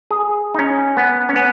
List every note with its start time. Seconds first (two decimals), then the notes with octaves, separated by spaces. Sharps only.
0.11 G#4
0.54 D#4
0.59 C#4
0.97 B3
1.29 C#4
1.36 B3